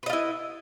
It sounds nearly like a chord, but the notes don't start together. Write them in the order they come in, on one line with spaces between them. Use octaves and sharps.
B4 D#5 F4 E4